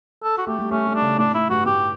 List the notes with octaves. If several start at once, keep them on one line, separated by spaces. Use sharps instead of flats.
A4
F#4
A3 G4
G3
A3 C#4
G3
D4
C#3
A2 D4
A2 E4
G2 F#4
A2 G4